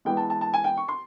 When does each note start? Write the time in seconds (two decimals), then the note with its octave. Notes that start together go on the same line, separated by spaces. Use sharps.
0.05 E3 G#3 B3 G5
0.17 A5
0.30 A5
0.41 A5
0.54 G#5
0.64 G5
0.77 C#6
0.88 C6